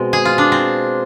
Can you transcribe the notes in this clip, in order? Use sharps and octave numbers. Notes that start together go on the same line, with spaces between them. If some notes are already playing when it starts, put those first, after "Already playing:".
Already playing: B2 G#3 C4
G#4
F4
D4
C4